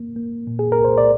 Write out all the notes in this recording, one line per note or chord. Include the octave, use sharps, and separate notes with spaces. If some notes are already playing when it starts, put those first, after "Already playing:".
Already playing: A#3
A#3
A#2
G#4
A#4
C2
C5
D5